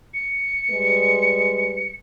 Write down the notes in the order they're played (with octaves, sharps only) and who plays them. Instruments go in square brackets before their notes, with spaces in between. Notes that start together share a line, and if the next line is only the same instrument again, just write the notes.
[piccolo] C#7
[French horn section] G3 G#3 B4